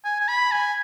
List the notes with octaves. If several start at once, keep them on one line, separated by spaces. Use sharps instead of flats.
G#5
G#5
B5
G#5